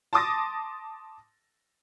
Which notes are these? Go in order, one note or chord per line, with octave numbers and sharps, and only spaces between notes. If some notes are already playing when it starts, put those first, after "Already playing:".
A5 C6 D6 D#6 A6 A#6